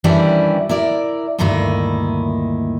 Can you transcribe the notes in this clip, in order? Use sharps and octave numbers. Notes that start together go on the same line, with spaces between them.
D#3 E3 G3 C#4 D4 E4
E4 A#4 D5
D2 G2 A#2 D#3 D#4 E4